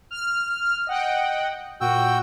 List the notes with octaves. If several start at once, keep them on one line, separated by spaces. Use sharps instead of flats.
F6
D#5 F#5 G5
A#2 F#4 G5 E6